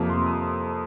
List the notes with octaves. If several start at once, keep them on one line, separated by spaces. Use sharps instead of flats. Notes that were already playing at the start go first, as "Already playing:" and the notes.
Already playing: F2 C3 F3 A#3
C6
D#6